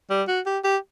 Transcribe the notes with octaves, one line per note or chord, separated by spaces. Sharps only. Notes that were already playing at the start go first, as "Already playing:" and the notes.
G3
F#4
G4
G4